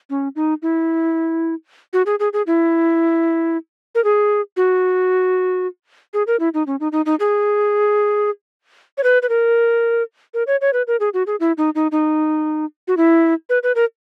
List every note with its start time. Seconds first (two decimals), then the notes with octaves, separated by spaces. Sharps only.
0.10 C#4
0.36 D#4
0.62 E4
1.93 F#4
2.06 G#4
2.20 G#4
2.33 G#4
2.47 E4
3.95 A#4
4.04 G#4
4.57 F#4
6.14 G#4
6.27 A#4
6.40 E4
6.54 D#4
6.67 C#4
6.80 D#4
6.92 D#4
7.06 D#4
7.20 G#4
8.98 C#5
9.04 B4
9.22 B4
9.29 A#4
10.34 A#4
10.47 C#5
10.61 C#5
10.73 B4
10.87 A#4
11.00 G#4
11.14 F#4
11.27 G#4
11.40 E4
11.58 D#4
11.75 D#4
11.92 D#4
12.88 F#4
12.97 E4
13.50 B4
13.63 B4
13.75 A#4